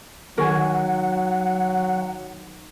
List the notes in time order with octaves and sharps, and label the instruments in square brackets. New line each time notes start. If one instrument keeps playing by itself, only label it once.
[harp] D#3 G#5 [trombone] F#3 [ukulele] F#4 A#4 [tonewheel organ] F#5